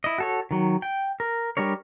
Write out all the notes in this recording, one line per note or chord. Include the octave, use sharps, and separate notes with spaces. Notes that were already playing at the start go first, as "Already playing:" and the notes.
E4 D#5
F#4 A4 C#5
D#3 F#3
G5
A#4
G3 D4 A#4 C#5